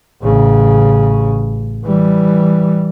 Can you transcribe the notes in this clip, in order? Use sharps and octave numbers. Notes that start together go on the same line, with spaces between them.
A1 C#3
E3 G3